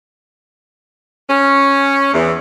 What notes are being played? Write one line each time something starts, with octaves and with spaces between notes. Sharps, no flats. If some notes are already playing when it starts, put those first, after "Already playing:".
C#4
E2